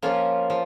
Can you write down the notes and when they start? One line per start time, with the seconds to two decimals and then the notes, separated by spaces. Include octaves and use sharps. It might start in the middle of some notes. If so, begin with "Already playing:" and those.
0.02 F3 A#3 C#4 F4
0.50 F3